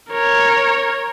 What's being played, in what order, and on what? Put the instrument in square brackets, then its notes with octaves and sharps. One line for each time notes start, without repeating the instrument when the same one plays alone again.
[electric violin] A#4 C#5